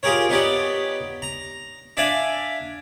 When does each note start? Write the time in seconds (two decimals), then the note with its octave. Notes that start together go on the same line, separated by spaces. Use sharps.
0.03 F4 G4 G#4 A#4 C#5
0.29 B3 D#4 G4 C#5 D5
1.22 A#5
1.97 D4 D5 E5 F5 G#5